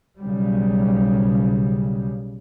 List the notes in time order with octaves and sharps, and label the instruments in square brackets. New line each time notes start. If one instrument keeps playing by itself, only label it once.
[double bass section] B1 C#3 F#3 G3